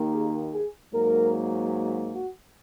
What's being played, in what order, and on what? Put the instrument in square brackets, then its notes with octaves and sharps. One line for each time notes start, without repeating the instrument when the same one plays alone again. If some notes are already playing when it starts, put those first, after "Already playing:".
Already playing: [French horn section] D#2 D#3 A#3
G#4
G#4
G#2 F#3 A#3 A#4
F#4